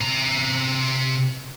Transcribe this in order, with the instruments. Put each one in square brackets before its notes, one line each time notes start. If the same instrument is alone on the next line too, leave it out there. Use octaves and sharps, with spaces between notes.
[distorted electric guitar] C3 A#5